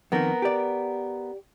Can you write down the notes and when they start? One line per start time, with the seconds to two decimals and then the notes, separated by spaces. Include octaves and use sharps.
0.12 F2 D#3 B3 A#4
0.42 G4 D5